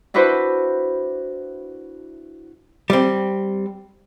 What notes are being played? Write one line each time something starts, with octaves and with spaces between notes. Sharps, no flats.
D4 E4 F#4 B4 C5
G3 C4